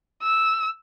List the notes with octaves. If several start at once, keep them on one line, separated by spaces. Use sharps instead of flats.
E6